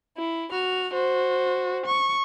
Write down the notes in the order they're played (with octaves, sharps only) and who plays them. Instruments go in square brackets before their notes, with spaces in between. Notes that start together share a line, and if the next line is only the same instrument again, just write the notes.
[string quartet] E4
[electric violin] F#4 [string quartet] F6
[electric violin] F#4 [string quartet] C5
[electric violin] C#6